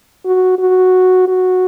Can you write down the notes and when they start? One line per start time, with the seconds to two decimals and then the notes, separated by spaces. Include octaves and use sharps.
0.25 F#4
0.58 F#4
1.28 F#4